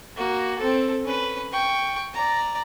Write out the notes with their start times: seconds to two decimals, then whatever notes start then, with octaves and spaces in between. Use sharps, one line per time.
0.16 A#3 F#4
0.59 C4 A4
1.05 C#4 B4
1.52 G5 C#6
2.13 D5 A#5